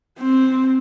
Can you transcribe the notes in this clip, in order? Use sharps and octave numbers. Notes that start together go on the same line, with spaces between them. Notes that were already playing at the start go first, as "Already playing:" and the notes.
C4